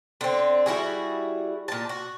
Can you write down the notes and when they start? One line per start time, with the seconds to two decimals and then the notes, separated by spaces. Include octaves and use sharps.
0.21 D3 C4
0.66 G3 E4 F#4 G#4
1.68 A#2 A5
1.89 F#4